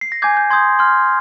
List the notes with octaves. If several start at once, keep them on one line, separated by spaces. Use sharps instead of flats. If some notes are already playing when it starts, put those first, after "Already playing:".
C7
A#6
G#5 D6 G6 G#6
G6
C6 D#6 G6 G#6
C6 F6